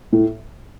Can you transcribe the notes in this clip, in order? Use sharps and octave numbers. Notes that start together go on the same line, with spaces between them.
A2